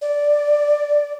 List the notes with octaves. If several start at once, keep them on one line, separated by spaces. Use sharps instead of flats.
D5